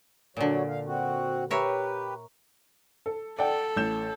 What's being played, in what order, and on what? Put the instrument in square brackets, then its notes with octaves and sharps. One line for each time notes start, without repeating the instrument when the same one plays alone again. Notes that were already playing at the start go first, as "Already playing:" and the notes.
[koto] A#2 D3 [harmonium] F#3 C#5
[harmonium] F5
C4 F#4
[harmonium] G4 B4 [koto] A#4 C#5 E5
[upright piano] A4
[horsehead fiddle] A4 [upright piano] D5 F#5 G5
[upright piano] A1 G6 E7